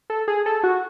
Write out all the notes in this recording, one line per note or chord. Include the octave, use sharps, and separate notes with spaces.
A4
G#4
A4
F#4